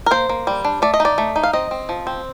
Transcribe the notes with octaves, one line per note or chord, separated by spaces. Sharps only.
A#4
A#3 C5
A#3
G3
D4
A3 D5
D#5
D#4
D5
A3
D#4
F5
C4 D#5
C4
F3
C4